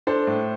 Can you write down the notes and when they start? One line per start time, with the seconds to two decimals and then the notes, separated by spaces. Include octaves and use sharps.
0.07 D4 A4 C5
0.27 A2